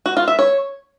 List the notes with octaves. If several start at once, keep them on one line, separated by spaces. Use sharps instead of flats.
F#4
F4
E5
C#5